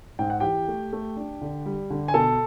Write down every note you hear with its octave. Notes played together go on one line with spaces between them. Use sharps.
G#2 G5
F#5
E3 G4 G5
A3
A3
D4
D3
G3
D3
G#5
B2 A4 A5